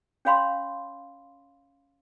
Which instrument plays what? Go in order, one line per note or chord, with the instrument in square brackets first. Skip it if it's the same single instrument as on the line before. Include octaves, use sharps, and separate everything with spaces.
[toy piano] C#4 C#5 F5 B5 C6